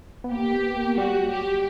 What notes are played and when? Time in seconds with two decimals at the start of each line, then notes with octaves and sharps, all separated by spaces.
0.24 B3
0.31 A#3 G4
0.53 B3
0.76 A#3
0.98 G3 F#4
1.19 F#3
1.31 G4
1.42 G3